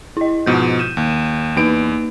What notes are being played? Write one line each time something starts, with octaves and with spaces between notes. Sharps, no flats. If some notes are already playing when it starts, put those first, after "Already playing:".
E4 D#5
G#2 B2 F3 G6
G6 D#7 E7
D#2
E2 A#3 D#4 B4 D7